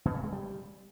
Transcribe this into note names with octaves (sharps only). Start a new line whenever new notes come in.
B2
C#3
G#3
G3